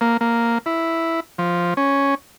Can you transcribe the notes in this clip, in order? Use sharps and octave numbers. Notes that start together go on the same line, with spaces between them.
A#3
A#3
E4
F3
C#4